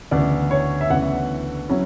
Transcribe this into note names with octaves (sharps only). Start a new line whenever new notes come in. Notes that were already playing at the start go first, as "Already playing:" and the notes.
D2 C#3 E3 B3 D5
C#5
E5
D2 C#3 E3 B3 F#5
F#3 C#4 E4